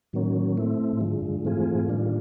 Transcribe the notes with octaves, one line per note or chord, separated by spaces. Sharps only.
A2 D#3 F#3 A#3 C#4
A3 C4 E4
A2
G#2 D3 F3 G#3
G2
G#2 E3 A3 C4 F4 G#4
G2
G#2
A2 D#3 G3 A#3 D4 F4